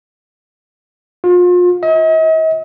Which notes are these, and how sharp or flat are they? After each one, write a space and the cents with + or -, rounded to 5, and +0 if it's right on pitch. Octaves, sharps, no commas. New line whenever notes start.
F4 +35
D#5 +45